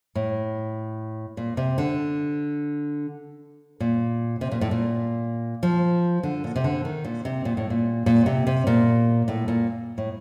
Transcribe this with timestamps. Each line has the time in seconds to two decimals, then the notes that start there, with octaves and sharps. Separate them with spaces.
0.15 A2
1.37 A#2
1.57 C3
1.78 D3
3.80 A#2
4.41 C3
4.52 A#2
4.61 A2
4.71 A#2
5.63 F3
6.23 D3
6.44 A#2
6.56 C3
6.64 D3
6.85 D#3
7.04 A#2
7.25 C3
7.45 A#2
7.57 A2
7.70 A#2
8.06 A#2
8.26 C3
8.47 C3
8.67 A#2
9.28 A2
9.48 A#2
9.98 A2